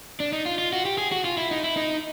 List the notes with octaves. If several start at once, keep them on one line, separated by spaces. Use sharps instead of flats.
D4
D#4
F4
F4
F#4
G4
G#4
F#4
F4
E4
D#4
E4
D#4